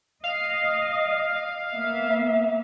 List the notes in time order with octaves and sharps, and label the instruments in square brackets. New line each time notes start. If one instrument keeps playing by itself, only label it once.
[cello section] D#5 [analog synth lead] F5
[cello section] A#3 B3 E5